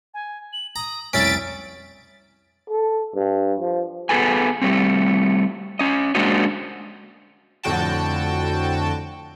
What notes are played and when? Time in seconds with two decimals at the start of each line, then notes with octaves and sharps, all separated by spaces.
0.14 G#5
0.53 F#7
0.76 A#5 D#6
1.13 F1 C2 C#4 E4 A6 B6 D7
2.70 A4
3.15 G2
3.60 F3
4.09 B3 G#4 A4 B4 G#5
4.62 G3 A3 C4
5.79 C#4 D#5
6.15 G#3 A#3 D4 F#4 C5 D#5
7.63 F2 A2 D3 F#4 G5 A5